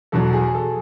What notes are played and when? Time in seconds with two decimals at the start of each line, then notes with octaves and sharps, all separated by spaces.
0.12 E2 B2 F#3 A4
0.33 G#4
0.55 A4